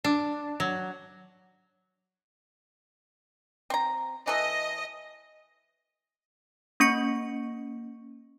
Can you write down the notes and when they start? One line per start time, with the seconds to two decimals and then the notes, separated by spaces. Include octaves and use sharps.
0.04 D4
0.60 F#3
3.70 C4 A#5
4.27 E3 A4 D#5
6.80 A#3 C#4 C#6 C#7